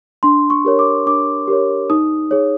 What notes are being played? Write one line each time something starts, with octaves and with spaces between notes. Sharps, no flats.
D4 C6
C#6
G4 A#4 C#5
D6
D4 D6
G4 A#4 C#5
D#4 D#6
G#4 C#5